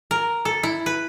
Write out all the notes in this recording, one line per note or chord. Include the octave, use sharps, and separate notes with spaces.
A#4
A4
E4
B4